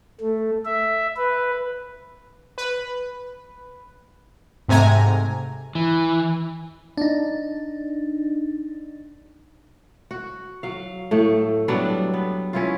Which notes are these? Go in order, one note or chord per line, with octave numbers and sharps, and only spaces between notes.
A3
E5
B4
B4
G#2 C3 A3 G#5 A#5
E3
D4 D#4
F#4
F#3 F5
A2 A3
F#3 G3 B3 D4
B3
C#4 E4 F4